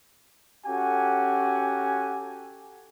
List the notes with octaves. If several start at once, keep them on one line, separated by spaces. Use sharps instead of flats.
C#4 F#4 G4 A4 F#5 G#5